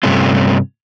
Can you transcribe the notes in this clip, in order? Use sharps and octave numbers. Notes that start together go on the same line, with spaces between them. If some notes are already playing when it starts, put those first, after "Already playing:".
G2 C3 A3 C#4 F4